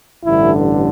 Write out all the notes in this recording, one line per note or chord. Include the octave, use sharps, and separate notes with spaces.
A1 G2 D3 E4